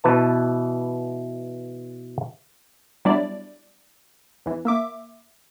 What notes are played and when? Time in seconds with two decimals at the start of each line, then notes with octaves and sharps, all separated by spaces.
0.04 B2 E3 B4 A5
3.05 F#3 G3 B3 D4 E4 D5
4.46 E2 E3
4.65 A#3 E5 D6